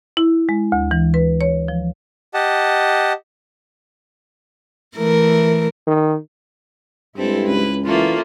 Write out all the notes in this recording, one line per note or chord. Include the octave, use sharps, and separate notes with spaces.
E4
G#3
D2
E3
B4
C#5
F3
G4 D#5 F#5 A5
E3 A3 A#4
D#3
G2 G#3 C4 E4 A4
C#2 B4
E3 A3 A#3 C#4 F4